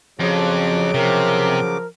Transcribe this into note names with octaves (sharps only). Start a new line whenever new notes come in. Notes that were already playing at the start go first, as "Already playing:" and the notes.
F2 C#3 F3 F#3 D6
C3 F3 A#4